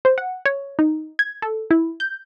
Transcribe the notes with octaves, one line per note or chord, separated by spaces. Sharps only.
C5
F#5
C#5
D#4
G#6
A4
E4
G6